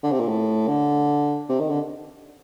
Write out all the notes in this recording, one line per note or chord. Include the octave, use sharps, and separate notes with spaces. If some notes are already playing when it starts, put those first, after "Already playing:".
D3
C3
A#2
A2
D3
C3
D#3
D3